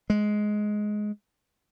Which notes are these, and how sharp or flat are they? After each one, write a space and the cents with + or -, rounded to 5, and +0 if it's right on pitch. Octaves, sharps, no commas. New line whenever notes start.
G#3 +10